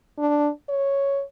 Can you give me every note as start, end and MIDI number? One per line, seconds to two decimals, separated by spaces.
0.18 0.50 62
0.69 1.22 73